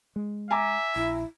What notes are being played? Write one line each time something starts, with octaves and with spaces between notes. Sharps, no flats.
G#3
E5 G#5 A#5 D6
A#1 E4